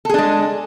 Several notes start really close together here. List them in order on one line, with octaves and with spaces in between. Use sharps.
A4 G#4 D4 G#3